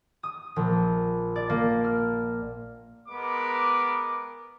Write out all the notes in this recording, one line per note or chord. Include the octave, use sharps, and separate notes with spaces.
D#6
A#1
D5
A#3
F6
G#3 B3 A#4 D6